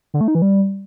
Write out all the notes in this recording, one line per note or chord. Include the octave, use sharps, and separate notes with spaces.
D3
A3
D#4
E3
G3